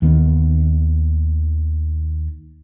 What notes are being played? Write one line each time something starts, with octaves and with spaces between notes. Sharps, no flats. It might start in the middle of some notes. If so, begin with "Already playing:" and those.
D#2 D#3 B3